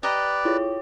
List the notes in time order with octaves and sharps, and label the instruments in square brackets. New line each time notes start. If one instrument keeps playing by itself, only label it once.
[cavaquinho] G4 D#5 A#5 [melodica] B4 D5
[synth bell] E4 F4 C#5